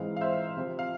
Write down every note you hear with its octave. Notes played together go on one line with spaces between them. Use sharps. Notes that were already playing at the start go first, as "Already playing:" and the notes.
Already playing: G#2 E3 G#3 C4 F5
F5
C5 E5
C3 F3 C4
F5